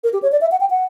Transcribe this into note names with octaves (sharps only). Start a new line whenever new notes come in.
A#4
G4
C#5
D5
E5
F#5
G5
F#5